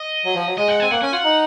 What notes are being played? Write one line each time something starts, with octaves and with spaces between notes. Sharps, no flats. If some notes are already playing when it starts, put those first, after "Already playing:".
Already playing: D#5
F#3
F3
F#3
G#3 D#5
F#5
C4 G#5
A#3 F#5
C#4 G#5
F4 F#5
D#4